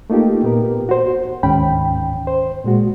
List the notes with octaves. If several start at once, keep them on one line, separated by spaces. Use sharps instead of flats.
A3 A#3 D#4 F4 G4
A#2 B3 G4 A#4
F#4 C5
D2 G#2 D#3 C#4 G5 B5
C5
A#2 G#3 F#4